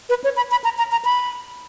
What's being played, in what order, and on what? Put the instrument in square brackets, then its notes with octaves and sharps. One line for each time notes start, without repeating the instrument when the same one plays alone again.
[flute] B4
C#5
B5
B5
A#5
A#5
A#5
B5